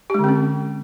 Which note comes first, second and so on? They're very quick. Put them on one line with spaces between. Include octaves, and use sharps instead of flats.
G4 G#3 D3 C4 C#4